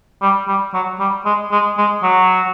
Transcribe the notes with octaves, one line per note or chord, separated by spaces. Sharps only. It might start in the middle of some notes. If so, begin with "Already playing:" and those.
G3
G3
F#3
G3
G#3
G#3
G#3
F#3